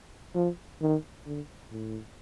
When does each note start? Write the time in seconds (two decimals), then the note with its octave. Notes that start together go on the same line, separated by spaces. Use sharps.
0.35 F3
0.82 D#3
1.26 D3
1.72 A2